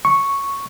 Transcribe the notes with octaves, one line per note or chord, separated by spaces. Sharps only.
C#6